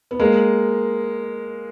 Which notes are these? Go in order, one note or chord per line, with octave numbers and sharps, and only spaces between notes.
B3
G#3 A#3